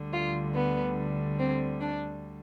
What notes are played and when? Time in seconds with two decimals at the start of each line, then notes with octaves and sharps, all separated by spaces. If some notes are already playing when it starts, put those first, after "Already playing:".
Already playing: D2 D3 G3
0.13 F4
0.54 B3
1.38 C4
1.80 D4